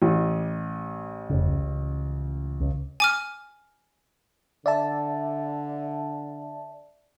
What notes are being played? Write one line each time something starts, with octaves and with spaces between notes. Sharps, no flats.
A1
F1 C#3
C#2
C#2
G#5 D6 F6
D3 D5 E5 A5